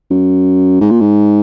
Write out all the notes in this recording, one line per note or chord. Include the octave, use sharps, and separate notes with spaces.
F#2
G#2
A#2
G#2